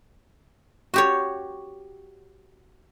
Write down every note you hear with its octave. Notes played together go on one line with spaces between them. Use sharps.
F#4 G4 C#5